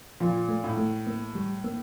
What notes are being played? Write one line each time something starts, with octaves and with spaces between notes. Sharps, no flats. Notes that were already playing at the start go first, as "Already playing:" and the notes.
A#2 F3
A3
A2
A3
A#3
G3
A#3